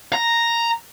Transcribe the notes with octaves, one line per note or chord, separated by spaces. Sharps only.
A#5